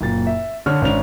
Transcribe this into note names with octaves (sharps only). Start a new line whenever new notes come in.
F#1 A#2 A6
E5
D3 D4 C#5 F6
G#1 C#4 D4 F7